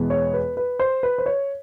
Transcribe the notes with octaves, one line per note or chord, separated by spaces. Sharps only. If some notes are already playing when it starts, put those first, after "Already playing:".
Already playing: E2 B2 G#3 B3
C#5
B4
B4
C5
B4
C5
C#5